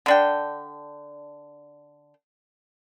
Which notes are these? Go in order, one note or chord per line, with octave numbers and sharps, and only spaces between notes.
D3 D4 G5